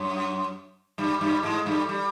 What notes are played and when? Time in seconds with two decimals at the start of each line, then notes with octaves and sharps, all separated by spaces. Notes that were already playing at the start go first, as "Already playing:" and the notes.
Already playing: F#2 F#3
0.98 G2 G3
1.21 G2 G3
1.43 G#2 G#3
1.66 G2 G3
1.89 G3